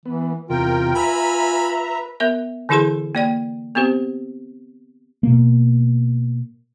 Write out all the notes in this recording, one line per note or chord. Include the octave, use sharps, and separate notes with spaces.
E3 B3
E2 C3 F4 A#4 G5
B4 E5 G#5 A#5 B5
B3 A#4 E5
D3 E3 E4 G#4 B4 C6
A#3 D5 G5
B3 C4 G4 C5
B2 A#3